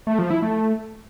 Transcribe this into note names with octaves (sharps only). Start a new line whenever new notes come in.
A3
F3
E4
A3